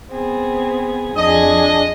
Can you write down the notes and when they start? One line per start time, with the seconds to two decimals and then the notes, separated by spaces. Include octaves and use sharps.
0.10 B3 C4 G#4
1.17 F2 D4 G#4 D#5